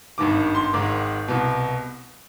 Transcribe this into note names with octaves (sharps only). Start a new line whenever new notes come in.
G#1 G2 D#3 D6
C6
G#1 G#2 D#3 D6
C2 B2